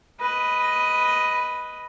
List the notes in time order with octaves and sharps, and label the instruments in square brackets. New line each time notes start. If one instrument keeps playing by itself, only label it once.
[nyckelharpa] B4 D#5